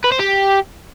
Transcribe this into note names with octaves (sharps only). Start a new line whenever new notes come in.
B4
C5
G4